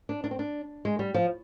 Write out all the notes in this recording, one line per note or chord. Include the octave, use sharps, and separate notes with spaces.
D4
D4
C4
D4
G#3
G3
F3